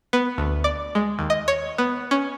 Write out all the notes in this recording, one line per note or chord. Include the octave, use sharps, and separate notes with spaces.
B3
D2
D5
G#3
D#2
D#5
C#5
B3
C#4